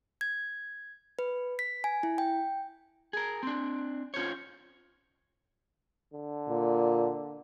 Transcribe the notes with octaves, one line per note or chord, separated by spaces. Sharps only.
G#6
B4
B6
G#5
E4
G5
G#4 A#4
C4 D4
C#4 F4 C5 C#5
D3
A#2